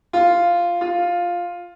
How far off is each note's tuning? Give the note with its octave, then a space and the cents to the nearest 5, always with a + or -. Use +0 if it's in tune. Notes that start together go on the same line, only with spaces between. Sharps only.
F4 -5
F4 +5